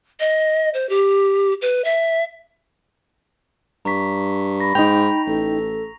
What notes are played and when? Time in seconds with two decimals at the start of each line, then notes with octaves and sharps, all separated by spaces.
0.20 D#5
0.74 C5
0.89 G4
1.62 B4
1.84 E5
3.85 G2 A#5 C#6 B6
4.60 B5 A#6
4.75 G#2 D#4 G5 F7
5.27 A1 A4